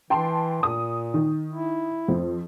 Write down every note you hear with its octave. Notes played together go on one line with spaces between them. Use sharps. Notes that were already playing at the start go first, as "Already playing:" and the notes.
E3 G5 A5 C6
A#2 D#6
D#3
E4
F2 C4